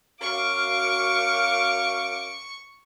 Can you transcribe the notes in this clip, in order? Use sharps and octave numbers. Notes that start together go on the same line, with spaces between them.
F#2 F#4 F5 C#6 D6